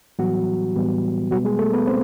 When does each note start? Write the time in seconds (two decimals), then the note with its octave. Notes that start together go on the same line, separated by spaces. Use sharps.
0.19 A2 E3 F#3 G3 B3 F#4
0.75 A2 E3 G3 B3
1.31 B2 F#3 G3 B3 F#4
1.45 G#3 G#4
1.59 A3 A4
1.73 B3 B4
1.87 B3 C4 C5